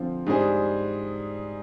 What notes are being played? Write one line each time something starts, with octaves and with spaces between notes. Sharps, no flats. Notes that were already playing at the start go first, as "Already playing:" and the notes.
Already playing: D3 F3 C4 F4
G#2 G3 D4 G#4 C5